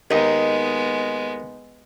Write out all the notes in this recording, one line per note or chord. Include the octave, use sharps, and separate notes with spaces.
D#2 G#3 B3 D#4 D#5